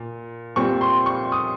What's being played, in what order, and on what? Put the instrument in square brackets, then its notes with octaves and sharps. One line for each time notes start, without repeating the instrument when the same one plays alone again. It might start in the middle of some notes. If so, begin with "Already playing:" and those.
Already playing: [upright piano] A#2
A#2 G3 C4 C#6
C6
C#6
D#6